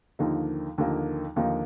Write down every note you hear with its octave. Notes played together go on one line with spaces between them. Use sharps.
D#2 D3 F3 A#3 D#4
D#2 D3 F3 A#3 D#4
D#2 D3 F3 A#3 D#4